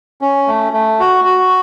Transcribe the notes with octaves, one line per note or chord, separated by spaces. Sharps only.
C#4
A3
A3
F#4
F#4